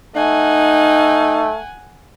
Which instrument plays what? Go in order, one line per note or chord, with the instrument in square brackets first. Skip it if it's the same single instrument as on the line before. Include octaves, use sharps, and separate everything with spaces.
[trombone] A3 [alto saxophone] D#4 [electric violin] F#5 G#5